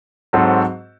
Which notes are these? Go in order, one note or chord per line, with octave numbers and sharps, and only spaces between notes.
G#2 F#3 C4 F#4 A4